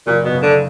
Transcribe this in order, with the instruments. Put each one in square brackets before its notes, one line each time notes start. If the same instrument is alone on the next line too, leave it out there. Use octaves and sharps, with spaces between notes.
[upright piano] F#1 [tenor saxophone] A#2
[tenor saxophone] B2
[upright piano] C#3
[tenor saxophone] D3